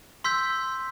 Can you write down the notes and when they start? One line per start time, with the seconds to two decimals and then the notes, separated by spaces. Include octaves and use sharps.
0.24 C6 E6 G6 B6